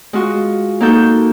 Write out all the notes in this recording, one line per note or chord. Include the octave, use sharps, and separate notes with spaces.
G#3 F4 F#4
A#3 D#4 F#4 A4 G6